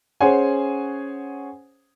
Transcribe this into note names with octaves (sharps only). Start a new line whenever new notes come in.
C#4 G#4 C5 C#5 F#5 G#5